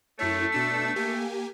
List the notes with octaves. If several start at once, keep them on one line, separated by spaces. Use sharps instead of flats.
F#2 A3 E4 C#5
B2 D4 E6
A#3 G4 G#5